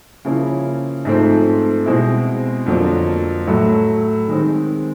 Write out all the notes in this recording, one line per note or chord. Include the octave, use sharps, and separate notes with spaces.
C#3 F3 A#3 C#4 E4
G#2 F3 A3 C4
B2 G#3 C4 E4
F2 D3 F#3 A#3
A2 F#3 A3
D#3 G#3 C4